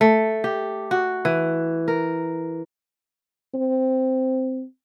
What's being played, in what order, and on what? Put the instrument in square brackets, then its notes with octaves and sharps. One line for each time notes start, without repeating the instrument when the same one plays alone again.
[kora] A3
G4
F#4
E3
A#4
[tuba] C4